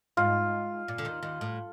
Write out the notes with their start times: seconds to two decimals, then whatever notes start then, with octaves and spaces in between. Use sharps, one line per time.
0.17 G#2 F4
0.88 A#2
0.98 D3
1.05 D#2 D#3
1.23 D#2 D#3
1.41 A2